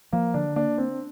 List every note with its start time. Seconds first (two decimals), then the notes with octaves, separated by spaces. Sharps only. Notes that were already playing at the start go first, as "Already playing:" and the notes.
0.13 F3 A#3
0.34 D3 D4
0.56 A#3 D4
0.78 C4 D4